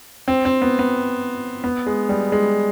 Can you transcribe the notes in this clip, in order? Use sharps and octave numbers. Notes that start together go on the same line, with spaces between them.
C4
C4
B3
B3
B3
G#3
G3
G#3